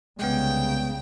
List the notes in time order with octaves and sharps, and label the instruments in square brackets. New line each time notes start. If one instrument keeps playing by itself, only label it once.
[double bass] C2 C#3 [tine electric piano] G#3 B3 [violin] G5